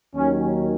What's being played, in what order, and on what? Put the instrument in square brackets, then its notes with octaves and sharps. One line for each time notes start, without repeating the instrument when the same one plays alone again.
[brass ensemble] D#2 D#3 F#3 C#4